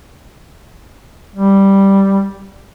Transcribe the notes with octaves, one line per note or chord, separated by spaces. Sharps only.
G3